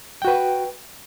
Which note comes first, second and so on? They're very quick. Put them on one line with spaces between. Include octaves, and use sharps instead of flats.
G5 F#4 B4